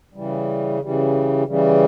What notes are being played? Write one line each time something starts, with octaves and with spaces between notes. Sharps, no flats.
C#3 E3 G3
C#3 E3 G3
C#3 E3 G3